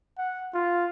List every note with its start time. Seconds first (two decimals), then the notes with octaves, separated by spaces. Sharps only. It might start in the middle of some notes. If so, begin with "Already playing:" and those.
0.18 F#5
0.54 F4